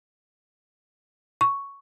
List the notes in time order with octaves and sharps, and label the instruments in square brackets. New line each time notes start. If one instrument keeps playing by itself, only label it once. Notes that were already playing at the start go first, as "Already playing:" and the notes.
[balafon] C#6